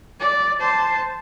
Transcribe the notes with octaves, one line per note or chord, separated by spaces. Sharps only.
D5
C5 A5